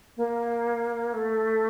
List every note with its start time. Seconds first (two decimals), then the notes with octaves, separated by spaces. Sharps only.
0.17 A#3
1.13 A3